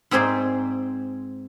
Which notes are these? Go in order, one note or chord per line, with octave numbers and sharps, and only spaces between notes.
G#2 C4 G#4 C5 D5